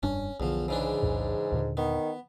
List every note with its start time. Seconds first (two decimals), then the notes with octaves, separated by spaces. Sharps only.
0.03 F1 G2 C#4 D4
0.40 B1 E2 D3 F3
0.68 G#2 C#3 E3 D4
1.03 B1 E2 A2
1.52 D#2 A#2 D3
1.77 D#3 B3